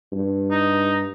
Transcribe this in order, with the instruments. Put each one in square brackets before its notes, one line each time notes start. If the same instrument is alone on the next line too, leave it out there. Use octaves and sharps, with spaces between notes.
[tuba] G2
[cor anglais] D#4